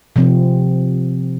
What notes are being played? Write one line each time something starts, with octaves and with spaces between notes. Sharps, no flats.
C3 F3 C4